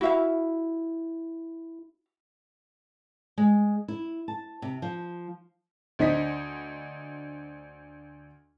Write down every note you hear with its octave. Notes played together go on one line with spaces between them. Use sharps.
E4 F#4 E5 F5
G#3
E4
A5
C3
F3
D2 D4 C5 D#5 B6